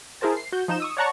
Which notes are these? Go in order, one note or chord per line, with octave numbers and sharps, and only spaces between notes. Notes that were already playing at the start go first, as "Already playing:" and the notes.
E4 G#4 A#4 C5 A5
C7
F#4 G6
F3 D#4 G6 E7
C#6 D#6 E6
C#5 D5 F#5 A5 A#5 C#6